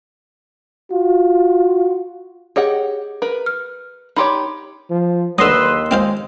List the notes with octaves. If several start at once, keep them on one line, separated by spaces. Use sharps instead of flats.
F4 F#4
G4 G#4 C#5 D#5 F#5
A#4 B4
F6
D#4 G4 C#5 B5 C6 D6
F3
D#2 D3 F#3 B4 D#5 C6 E6
G#3 C4 F4 C5